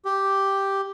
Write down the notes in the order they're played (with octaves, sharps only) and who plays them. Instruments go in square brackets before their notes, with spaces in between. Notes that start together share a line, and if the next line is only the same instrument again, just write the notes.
[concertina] G4